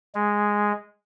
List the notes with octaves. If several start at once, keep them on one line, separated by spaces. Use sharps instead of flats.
G#3